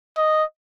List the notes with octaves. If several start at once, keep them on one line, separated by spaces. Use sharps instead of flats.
D#5